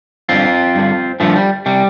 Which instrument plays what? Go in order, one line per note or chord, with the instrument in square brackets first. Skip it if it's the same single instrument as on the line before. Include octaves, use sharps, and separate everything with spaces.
[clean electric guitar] G2 D3 C4 F4
G2 D3
G2 D3 F3 A3
G3
C3 G3